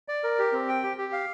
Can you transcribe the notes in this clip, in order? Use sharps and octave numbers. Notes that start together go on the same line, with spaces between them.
D5
A#4
G4
C4
G5
G4
G4
F5